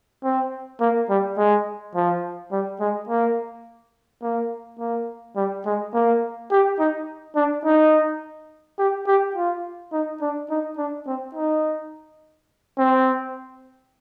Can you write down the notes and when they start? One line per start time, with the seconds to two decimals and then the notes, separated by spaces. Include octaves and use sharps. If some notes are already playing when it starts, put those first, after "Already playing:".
0.24 C4
0.80 A#3
1.09 G3
1.37 G#3
1.95 F3
2.51 G3
2.80 G#3
3.09 A#3
4.23 A#3
4.79 A#3
5.36 G3
5.66 G#3
5.94 A#3
6.51 G4
6.79 D#4
7.36 D4
7.65 D#4
8.79 G4
9.07 G4
9.36 F4
9.92 D#4
10.21 D4
10.50 D#4
10.78 D4
11.07 C4
11.35 D#4
12.78 C4